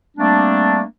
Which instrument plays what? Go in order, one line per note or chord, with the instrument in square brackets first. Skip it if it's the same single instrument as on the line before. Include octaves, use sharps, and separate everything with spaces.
[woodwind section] G3 A3 A#3 C4 D4